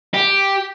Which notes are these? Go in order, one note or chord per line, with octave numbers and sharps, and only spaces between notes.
G4